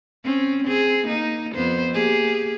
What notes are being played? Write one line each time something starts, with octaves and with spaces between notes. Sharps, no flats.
C4 C#4
C4 G#4
A#3 D#4
F2 B3 C5
A#3 G4 G#4